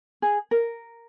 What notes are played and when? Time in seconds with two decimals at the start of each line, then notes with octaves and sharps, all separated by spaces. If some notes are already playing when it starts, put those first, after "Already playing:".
0.22 G#4
0.51 A#4